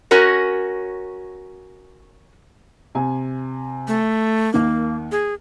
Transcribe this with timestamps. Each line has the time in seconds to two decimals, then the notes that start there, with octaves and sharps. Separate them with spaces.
0.11 C#4 F#4 A#4 C#5
2.95 C3 G#5
3.88 A3
4.54 D#2 D#3 A#3
5.12 G#4